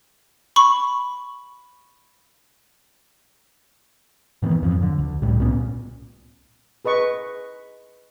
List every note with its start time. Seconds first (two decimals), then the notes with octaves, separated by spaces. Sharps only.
0.56 B5 C#6
4.42 G#2 D#3 E3 B3
4.62 F2 F3 F#3
4.82 D3
4.99 D2
5.22 C#2 A2 G3
5.39 C2 A#2 B3 C#4
6.85 G#4 B4 D#5 C#6